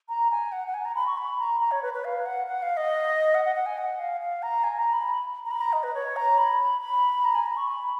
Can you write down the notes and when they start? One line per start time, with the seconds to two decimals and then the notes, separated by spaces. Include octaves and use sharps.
0.09 A#5
0.31 G#5
0.52 F#5
0.67 F#5
0.74 G#5
0.85 A#5
0.95 B5
1.07 C#6
1.17 B5
1.39 A#5
1.61 A#5
1.71 C#5
1.83 B4
1.94 B4
2.04 F5
2.26 F#5
2.47 F#5
2.62 F5
2.77 D#5
3.34 F#5
3.45 F#5
3.55 F#5
3.66 G#5
3.78 F#5
3.99 F5
4.21 F5
4.43 A#5
4.64 G#5
4.79 A#5
4.93 B5
5.45 A#5
5.51 B5
5.61 A#5
5.73 D#5
5.83 B4
5.94 C#5
6.16 A#5
6.38 B5
6.81 B5
7.25 A#5
7.35 G#5
7.46 B5
7.57 C#6
7.68 B5